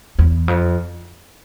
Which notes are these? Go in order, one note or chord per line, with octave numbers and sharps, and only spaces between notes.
E2
F2